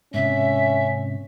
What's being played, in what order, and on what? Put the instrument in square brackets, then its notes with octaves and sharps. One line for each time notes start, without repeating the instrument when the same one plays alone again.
[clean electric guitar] G#2 C3 [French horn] C#4 [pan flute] E5